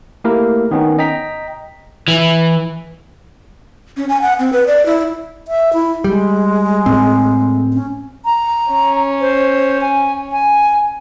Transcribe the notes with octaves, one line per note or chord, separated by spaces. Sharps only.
A3 A#3 E4 G4 A#4
D#3 B3 C#4 D#4
D#5 G5 A#5 B6
E3
C#4
G#5
F#5
C4
B4
D5
E4
E5
E4
G3 G#3
A2 C4
C#4
A#5
C#4
C5
G#5
G#5